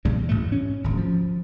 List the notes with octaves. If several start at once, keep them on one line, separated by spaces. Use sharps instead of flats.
E2 A#2 C#3 G3
A1 G#2 A3
C#4
D1 G#1
F3